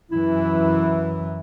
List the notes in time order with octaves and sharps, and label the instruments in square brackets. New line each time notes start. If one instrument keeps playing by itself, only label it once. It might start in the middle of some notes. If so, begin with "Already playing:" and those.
[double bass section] F#2 E3 [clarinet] E4